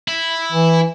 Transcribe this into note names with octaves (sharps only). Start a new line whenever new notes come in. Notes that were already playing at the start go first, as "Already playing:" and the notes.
E4
E3